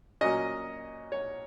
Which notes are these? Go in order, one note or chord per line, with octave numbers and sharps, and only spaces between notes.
A#2 F#3 C#4 D#5
C#5